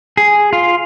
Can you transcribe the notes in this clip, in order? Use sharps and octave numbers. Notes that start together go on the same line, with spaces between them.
G#4
F4